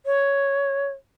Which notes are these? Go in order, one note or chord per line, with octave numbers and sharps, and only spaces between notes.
C#5